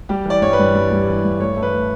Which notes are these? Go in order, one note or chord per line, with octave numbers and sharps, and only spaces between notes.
G3 G4
E3 D5
G2 C#5
B4
G2
G3
G3
E3
G2
A3 C#5
A3
B4
A3